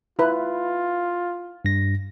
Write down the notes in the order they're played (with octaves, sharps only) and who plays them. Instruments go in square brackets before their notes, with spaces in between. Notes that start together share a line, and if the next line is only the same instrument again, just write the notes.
[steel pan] E4 B4 [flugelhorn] F4
[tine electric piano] G2 A#6